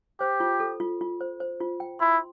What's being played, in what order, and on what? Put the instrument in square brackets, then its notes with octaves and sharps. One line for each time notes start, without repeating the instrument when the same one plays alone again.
[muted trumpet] G4 [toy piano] C5
[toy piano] F4
A4
F4
F4
C5
C5
F4
G5
[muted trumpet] E4 [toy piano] C6